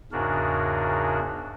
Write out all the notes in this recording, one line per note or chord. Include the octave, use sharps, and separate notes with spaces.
E2 G#2 C#3 D4 F#4 A#4